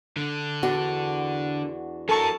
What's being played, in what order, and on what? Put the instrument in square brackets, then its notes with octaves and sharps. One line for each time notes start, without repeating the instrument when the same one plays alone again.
[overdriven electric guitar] D3
[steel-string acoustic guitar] E2 D4 F#4
[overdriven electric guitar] F#3 A#4 [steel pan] A4 C#6 [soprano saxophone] A5